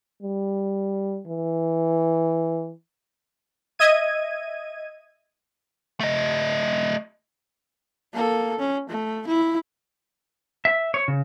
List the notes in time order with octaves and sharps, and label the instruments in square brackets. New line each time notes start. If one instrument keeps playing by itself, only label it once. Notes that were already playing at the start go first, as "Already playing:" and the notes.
[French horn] G3
E3
[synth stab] D#5 E5 G#6 D#7
[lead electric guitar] A3 D#5
[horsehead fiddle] A#3 A4
C#4
A3
E4
[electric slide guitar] E5
C#5
C#3